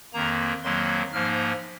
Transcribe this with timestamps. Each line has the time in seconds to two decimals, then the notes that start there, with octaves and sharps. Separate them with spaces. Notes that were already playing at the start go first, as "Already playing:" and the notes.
0.13 F2 D#3 A#3 A#5
0.63 F2 D#3 F#3 A#3 C6
1.13 G#2 F3 A#3 D#4 F6